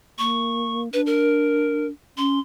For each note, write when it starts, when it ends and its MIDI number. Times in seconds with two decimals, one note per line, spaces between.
0.18 0.92 58
0.18 0.81 85
0.93 1.90 62
0.93 1.01 71
1.06 1.87 70
2.17 2.39 61
2.17 2.40 84